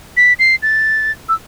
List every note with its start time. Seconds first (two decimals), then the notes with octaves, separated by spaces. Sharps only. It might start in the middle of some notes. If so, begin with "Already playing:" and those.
0.17 B6
0.39 C7
0.62 A6
1.29 E6